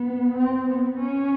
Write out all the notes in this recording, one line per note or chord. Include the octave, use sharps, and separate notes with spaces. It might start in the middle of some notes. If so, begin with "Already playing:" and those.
Already playing: B3
C4
B3
C#4